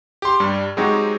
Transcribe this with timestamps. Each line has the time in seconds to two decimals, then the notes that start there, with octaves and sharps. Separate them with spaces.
0.22 G4 C6
0.40 G2 G3
0.77 F#3 G#3 C4 D#4 F#4 G4